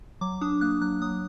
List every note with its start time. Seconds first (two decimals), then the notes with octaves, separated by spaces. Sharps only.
0.21 F#3 D6
0.41 D4 D#6
0.61 A#3 F#6
0.81 F#3 F#6
1.02 F#3 D#6